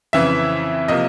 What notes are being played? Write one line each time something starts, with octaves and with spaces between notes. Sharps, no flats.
F2 C#3 E3 E5
C3 F3 A#3 D#5